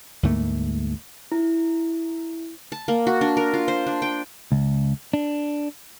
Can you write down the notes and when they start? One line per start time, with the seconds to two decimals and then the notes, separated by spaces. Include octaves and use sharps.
0.23 D2 G#2 A3 A#3
1.32 E4
2.72 A5
2.88 A#3
3.07 F#4
3.21 D4
3.37 A#4
3.54 F4
3.68 C5
3.87 D4
4.02 G5
4.52 C#2
5.13 D4